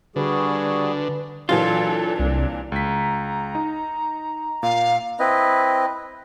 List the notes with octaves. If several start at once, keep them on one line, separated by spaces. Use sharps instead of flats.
D3 G3 F#4 G#4 B4
A#2 E3 F#3 D4 F4 A4
C2 A#3 D4
C#2 A#5 B6
D#4
A#2 F5
C4 E4 B4 D#5